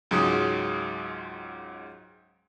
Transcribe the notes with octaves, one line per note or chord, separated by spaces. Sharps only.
C#2 G#2 F#3 G#3 D#6